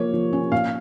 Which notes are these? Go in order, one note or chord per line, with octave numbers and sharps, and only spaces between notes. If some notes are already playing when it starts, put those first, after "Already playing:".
Already playing: F3 A#3 C#5
F3
C#4
A#2 F5